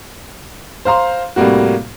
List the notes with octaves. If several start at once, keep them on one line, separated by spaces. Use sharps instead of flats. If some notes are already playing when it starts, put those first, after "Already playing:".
C5 F5 A#5 C6
A2 C3 G3 A#3 F#4